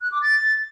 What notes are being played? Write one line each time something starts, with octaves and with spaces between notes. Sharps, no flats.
F#6
D6
A6